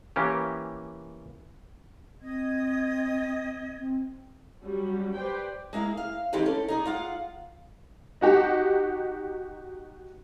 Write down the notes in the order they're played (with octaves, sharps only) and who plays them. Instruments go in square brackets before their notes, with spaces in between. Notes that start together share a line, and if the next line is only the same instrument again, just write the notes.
[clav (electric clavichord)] E3 A#3 C#4 G4
[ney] C4 [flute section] D#5 G#6
[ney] C4
[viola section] F#3 G3 C#4 F#4
G4 B4 C5 D5 G5
[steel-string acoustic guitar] G#3 A#3 E4 F5
F5
D#3 E3 C4 G4 B4
C#4 A4
D#4 G#4 D5
F4 F5 F#5
[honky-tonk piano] D#4 F#4 G4